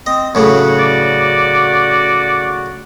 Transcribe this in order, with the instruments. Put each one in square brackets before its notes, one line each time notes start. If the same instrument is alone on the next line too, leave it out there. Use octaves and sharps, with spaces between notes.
[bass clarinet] C4 [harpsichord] D#5
[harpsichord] F#2 A2 C#3 [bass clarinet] F#4
[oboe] D5